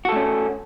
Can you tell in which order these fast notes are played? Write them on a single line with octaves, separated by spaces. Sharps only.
F#4 A4 A3 C#4